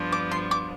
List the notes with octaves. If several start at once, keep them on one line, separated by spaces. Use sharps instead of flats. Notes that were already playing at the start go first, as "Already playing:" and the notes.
Already playing: G2 F3 B3 D4
D6
C6
D6